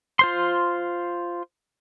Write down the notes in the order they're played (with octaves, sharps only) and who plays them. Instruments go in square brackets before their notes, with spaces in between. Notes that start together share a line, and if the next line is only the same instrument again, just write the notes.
[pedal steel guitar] F4 C5 C6